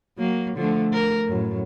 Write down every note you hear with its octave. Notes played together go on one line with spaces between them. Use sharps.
F#3 A#3
D3 F3 A3
A#4
F#2 A2